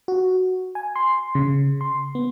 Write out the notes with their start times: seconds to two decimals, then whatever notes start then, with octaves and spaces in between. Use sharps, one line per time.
0.08 F#4
0.75 G#5
0.96 C6
1.35 C#3
1.81 C6
2.15 B3